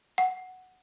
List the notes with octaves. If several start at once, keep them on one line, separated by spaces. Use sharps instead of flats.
F#5